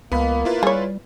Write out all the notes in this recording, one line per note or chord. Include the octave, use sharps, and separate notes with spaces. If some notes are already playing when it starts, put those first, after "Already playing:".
C#2 A#3 B3 B5
E4 F4 B4
G3 G#4 C#5